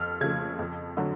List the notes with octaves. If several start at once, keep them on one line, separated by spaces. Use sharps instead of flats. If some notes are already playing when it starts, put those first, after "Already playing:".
Already playing: F2 F6
C#3 F3 A3 G#6
F2
D3 F#3